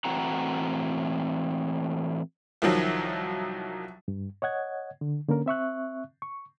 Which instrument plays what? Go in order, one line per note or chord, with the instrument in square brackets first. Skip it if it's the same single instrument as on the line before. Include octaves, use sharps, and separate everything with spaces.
[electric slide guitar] A2 E3 C4 F#4 F#5 A#5
[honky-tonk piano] C2 D#3 F3 F#3
[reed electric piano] G2
C#5 D#5 F#5 G#6
D3
D3 A#3 C#4 A#4
C4 E5 C#6 F#6
C#6